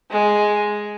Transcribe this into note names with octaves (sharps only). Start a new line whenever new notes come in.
G#3